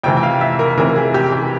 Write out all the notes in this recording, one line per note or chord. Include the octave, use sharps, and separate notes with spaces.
F2 C3 E3 G5
G5
F5
E5
A#4
F2 C3 E3 A#4
G#4
G4
G4